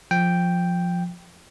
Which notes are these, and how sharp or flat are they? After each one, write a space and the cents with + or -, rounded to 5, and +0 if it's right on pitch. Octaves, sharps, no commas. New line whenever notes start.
F3 +10 G5 +0